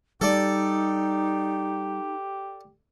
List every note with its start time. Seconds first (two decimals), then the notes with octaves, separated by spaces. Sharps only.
0.21 G3 D#4 G4 A4 D5